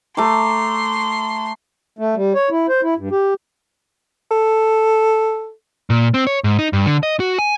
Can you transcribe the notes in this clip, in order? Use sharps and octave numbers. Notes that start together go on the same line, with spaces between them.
A3 A#5 C6 D6
A3
G3
C#5
E4
C5
E4
G2
G4
A4
A#2
C4
C#5
G#2
D#4
G2
D3
D#5
F#4
G#5